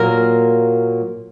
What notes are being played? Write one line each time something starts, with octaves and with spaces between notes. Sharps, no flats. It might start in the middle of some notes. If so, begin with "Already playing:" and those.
Already playing: A#2 F#3 A#3 A#4